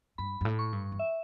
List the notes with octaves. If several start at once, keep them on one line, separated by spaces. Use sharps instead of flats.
G2 B5
G2
A2
C#6
G2
E2
E5